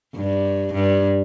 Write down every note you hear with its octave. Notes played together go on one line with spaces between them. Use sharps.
G2
G2